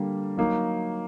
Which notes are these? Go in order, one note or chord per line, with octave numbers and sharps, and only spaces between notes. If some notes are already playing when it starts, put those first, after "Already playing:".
Already playing: D3 G3 A#3
F#3 A#3 D#4